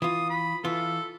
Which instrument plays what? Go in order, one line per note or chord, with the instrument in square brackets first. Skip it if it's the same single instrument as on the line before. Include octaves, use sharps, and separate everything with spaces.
[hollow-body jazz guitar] E3 F4 [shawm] D#6
[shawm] B5
[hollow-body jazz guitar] E3 F4 [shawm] A4